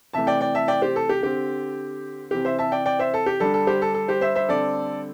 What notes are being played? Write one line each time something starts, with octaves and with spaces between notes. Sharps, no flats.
C3 E3 A3 E5 A5
D5 G5
D5 G5
E5 A5
D5 G5
G4 C5
A4
G4
D3 C4 G4
C3 E3 C4 G4
C5 E5
E5 A5
D5 G5
D5 G5
C5 E5
A4
G4
D3 G3 D4 A4
A4
G4 C5
A4
A4
G4 C5
C5 E5
C5 E5
D3 G3 C4 A4 D5